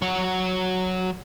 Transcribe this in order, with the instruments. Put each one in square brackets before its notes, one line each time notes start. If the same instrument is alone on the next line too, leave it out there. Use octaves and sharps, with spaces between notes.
[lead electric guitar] F#3 F#5